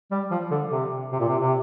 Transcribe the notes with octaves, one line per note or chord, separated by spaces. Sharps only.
G3
F3
D3
C3
C3
A#2
C3
C3